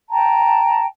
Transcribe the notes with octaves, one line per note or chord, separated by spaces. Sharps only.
G5 A5 A#5